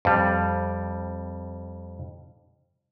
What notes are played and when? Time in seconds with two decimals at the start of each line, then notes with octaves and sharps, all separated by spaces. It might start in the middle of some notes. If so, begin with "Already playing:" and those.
0.05 F2 G3